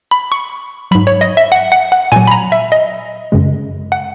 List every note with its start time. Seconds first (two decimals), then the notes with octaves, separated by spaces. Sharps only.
0.11 B5
0.32 C#6
0.91 F#3 B5
0.95 G#2
1.07 C#5
1.21 D#5
1.37 E5
1.52 F#5
1.72 F#5
1.92 F#5
2.12 A#2 F#3 G#5
2.27 B5
2.31 A#5
2.52 E5
2.72 D#5
3.32 F#2 C#3 G#3
3.92 F#5